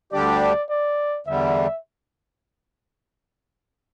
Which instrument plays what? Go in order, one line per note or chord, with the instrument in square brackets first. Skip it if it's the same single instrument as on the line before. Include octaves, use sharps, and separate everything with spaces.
[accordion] D2 D3 G3 D4 G4 [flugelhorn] D5
[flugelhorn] D5
[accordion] E2 D3 G3 [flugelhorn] E5